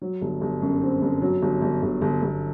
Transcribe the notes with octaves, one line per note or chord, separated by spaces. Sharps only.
F#3
G1
G1
F#2
C4
G1
F#3
G1
G1
G1
G1
G1